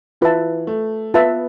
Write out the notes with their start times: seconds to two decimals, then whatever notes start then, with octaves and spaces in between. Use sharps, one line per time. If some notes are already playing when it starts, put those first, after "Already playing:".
0.21 E3 F4 B4 E5 A5
0.67 A3
1.14 B3 F4 B4 E5 A5